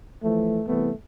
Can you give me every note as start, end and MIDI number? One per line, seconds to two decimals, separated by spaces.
0.23 0.61 52
0.23 0.61 53
0.23 0.61 57
0.67 0.91 36
0.67 0.91 52
0.67 0.91 57
0.67 0.91 59